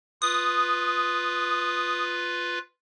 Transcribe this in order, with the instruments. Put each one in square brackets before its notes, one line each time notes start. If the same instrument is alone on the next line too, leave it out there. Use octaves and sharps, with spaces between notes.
[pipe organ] F4 B4 [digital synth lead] D#6